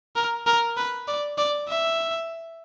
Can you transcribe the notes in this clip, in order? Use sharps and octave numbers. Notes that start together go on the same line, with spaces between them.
A#4
A#4
B4
D5
D5
E5